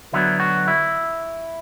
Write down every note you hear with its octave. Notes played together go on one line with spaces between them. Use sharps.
D3 F#3 B3 E4
F#4
E4